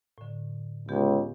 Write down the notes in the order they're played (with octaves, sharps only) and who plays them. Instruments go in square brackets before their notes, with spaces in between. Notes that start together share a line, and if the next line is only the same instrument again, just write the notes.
[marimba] A2 D3
[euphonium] C#2 [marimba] B3 G4 G#4